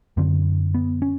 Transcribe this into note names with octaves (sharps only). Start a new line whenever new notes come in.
F#2 D3 C4
B3
C#4